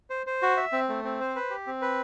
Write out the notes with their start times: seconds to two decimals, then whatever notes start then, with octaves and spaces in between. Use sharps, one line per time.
0.10 C5
0.27 C5
0.42 F#4
0.57 E5
0.72 C4
0.89 A3
1.04 C4
1.20 C5
1.36 B4
1.50 G4
1.67 C4
1.82 B4